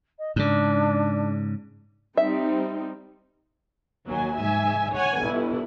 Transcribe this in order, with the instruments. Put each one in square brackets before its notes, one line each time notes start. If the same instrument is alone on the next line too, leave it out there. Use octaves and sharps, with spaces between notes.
[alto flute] D#5
[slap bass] G#2 C#3 [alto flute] D4
[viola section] G3 C4 D#4 [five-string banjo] E5
[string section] D#2 F#3 G#5
G#2 E5 G#5
C#5 F#5 G#5
G1 E4